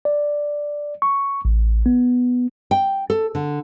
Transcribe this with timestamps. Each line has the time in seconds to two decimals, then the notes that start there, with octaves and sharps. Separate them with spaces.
0.05 D5
1.02 C#6
1.45 A1
1.86 B3
2.71 G5
3.10 A4
3.35 D3